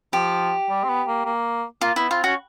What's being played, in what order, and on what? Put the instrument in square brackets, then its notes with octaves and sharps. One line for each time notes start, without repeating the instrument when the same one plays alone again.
[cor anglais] F3 [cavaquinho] G4
[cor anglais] G3
C4
B3
A#3
A#3
[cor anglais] A#3 [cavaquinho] F4
[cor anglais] B3 [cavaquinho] E4
[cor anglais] C4 [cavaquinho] F4
[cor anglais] C#4 [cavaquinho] F#4